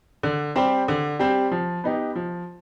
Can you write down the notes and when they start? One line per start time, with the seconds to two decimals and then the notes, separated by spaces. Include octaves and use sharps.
0.23 D3
0.56 G3 C4 G4 C5
0.88 D3
1.19 G3 C4 G4 C5
1.51 F3
1.84 B3 D#4 G4
2.16 F3